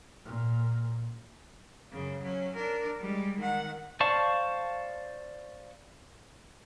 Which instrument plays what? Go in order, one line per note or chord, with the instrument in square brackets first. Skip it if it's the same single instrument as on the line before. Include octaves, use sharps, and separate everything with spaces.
[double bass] A#2
[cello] F#2 C#3
F#3 C#4
D4 A#4
G3 G#3
D#3 F#5
[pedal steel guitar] C5 D5 F5 A5 C#6